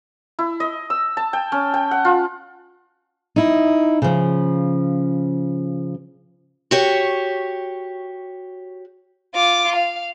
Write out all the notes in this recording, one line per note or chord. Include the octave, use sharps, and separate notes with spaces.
E4
D#5
E6
A5
G5
C#4
G5
F#5
F4
D#4 E4
C#3 F3
F#4 G4 C#5
F4 D6
F5